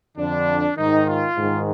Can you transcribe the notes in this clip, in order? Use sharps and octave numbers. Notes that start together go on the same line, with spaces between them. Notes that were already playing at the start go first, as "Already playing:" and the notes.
F2 D3 D4
G#2 D#3 D#4
F4
G#2 D#3